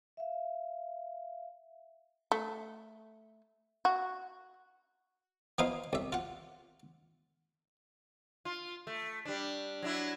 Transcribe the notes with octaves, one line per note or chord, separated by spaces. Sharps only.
E5 F5
A3
F#4
F3 B3 D#4 E4 C5 F5
C2 E5
F4 F#5
F4
A3
G3 D4
F#3 D4 E4